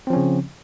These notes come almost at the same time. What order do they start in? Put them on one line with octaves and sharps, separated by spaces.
C4 F3 C#4 C#3